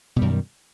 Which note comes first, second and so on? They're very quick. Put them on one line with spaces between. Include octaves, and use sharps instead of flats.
B2 G3 F#2 D#3